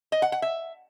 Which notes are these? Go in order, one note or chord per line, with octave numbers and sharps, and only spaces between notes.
D#5
F#5
F#5
E5